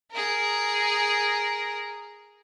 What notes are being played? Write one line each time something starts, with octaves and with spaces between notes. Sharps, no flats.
G#4 A#4